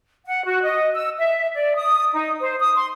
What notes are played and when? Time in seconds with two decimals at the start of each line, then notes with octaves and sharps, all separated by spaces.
0.26 F#5
0.44 F#4
0.62 D#5
0.94 E6
1.17 E5
1.55 D5
1.75 D#6
2.13 D#4
2.40 C5
2.58 D#6
2.75 C6